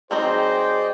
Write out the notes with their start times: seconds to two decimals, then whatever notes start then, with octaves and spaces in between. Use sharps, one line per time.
0.11 F#3 C4 D#4 G#4 C5 D5 D#5 G5